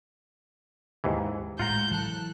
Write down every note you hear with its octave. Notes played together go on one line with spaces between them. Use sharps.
D#2 G#2 E3
A2 G#3 F4 F#5 A#5 G6
E3 F#3 A4 F#6